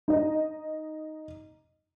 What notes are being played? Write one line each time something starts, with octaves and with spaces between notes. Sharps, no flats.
D#4 D#5